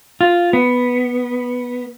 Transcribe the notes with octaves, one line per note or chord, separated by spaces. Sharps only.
F4
B3